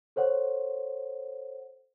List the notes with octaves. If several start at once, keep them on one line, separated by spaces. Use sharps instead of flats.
A4 C5 C#5 F#5